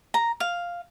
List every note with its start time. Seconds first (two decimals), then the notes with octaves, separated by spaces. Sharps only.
0.14 A#5
0.40 F5